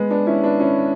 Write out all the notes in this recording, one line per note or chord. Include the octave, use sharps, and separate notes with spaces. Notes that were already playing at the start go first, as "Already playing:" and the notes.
Already playing: G#3 B3
B3 D4
C#4 E4
B3 D4
C#4 E4